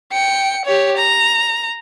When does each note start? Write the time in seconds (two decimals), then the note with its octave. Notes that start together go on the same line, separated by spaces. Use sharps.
0.12 G5 C#7
0.65 G4 C#5
0.97 A#5